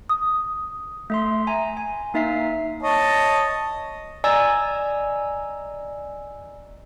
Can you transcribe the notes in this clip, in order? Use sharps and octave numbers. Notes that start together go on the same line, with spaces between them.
D#6
A3 E5 C6
G#5 A#5
G#5
A#3 D#4 E5 B6 C7
C#5 D#5 A5
D5 D#5 G#5 A#5 E6